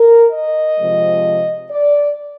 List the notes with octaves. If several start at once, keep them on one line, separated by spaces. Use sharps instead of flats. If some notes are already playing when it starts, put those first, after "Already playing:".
Already playing: A#4
D#5
C3 F3 G#3
D5